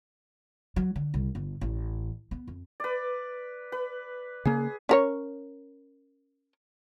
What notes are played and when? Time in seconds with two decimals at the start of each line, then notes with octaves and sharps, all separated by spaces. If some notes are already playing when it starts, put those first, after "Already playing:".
0.76 F#3
0.96 D3
1.14 C2
1.35 G1
1.61 A1
2.31 B3
2.48 F2
2.80 B4 D5
3.72 B4
4.45 C#3 A#3 G#4
4.89 C#4 A#4 C#5